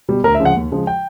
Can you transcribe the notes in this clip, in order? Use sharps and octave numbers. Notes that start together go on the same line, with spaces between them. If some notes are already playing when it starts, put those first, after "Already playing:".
B2 G3
D2 A#4
E5
C#3 F3 G#3
F#5
D#2
C#3 F3 G#3
G5